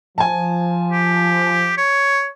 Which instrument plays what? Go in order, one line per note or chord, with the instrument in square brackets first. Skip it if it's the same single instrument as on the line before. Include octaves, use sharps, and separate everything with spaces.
[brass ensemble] F3 [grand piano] G#5 A5
[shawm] G4
C#5